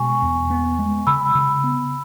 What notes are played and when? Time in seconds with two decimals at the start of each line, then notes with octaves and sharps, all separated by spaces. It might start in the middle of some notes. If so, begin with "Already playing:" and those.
Already playing: B2 G#3 G#5 C#6
0.22 E2
0.50 B3
0.79 G#3
1.07 C#3 B5 E6
1.35 C#3
1.64 B3